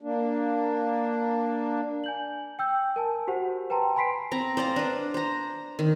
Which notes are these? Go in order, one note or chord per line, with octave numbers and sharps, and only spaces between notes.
A#3 D4
G#5 G6 F#7
G5 E6 G6
A#4 G#5 A5
F#4 G4 C5 F#5
B4 G5 A5 A#5 C6
G#5 B5 C6 B6 C7 D7
C4 A#5
C5 D5 F5 A#5
D4 B4
C5 A#5
D#3